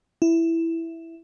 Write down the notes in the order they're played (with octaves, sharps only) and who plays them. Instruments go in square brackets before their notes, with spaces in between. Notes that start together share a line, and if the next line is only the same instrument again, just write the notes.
[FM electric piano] E4